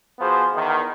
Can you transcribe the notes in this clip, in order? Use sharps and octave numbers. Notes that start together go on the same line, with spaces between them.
F3 B3 F#4 G#4 C5
E2 D#3